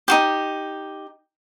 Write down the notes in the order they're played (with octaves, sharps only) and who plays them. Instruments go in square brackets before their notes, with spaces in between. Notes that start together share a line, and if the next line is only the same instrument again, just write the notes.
[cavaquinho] D#4 F#4 G4